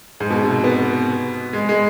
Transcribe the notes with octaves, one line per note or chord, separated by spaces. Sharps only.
G#2
B2
C3
B3
G#3
G#3